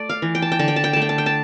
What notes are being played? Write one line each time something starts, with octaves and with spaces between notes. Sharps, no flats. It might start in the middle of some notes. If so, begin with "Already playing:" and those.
Already playing: A3 D5
F5
E3
G5
A5
G5
D3 A5
G5
A5
G5
A3 A5
G5
A5
G5
A5